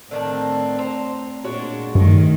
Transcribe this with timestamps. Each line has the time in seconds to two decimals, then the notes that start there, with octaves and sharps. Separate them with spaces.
0.11 A2 D3 D#3 C4 D4
0.79 C5 A#5
1.44 A#2 G#3 D4 F#4 C#5
1.95 G2 D#3 A3